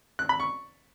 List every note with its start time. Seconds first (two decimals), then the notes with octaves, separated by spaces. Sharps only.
0.19 F#6
0.29 B5
0.40 C#6